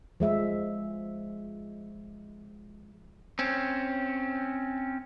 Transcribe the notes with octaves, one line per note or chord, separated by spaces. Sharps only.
F3 G#3 E5
C4 C#4